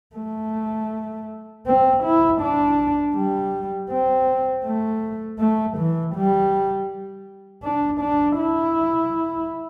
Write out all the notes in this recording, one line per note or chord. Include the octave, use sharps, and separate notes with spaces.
A3
C4
E4
D4
G3
C4
A3
A3
E3
G3
D4
D4
E4